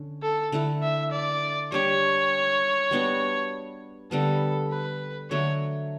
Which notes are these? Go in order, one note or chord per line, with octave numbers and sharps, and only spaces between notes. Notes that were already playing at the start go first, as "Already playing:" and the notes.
Already playing: D3 C#4
A4
D3 A3 E4 A4
E5
D5
G3 D4 G4 C#5
G3 B3 D4 F#4
D3 G3 B3 A4
B4
D3 F#3 A3 C#5